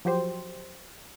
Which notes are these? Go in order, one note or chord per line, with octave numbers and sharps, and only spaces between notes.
F3 F#3 G4 C5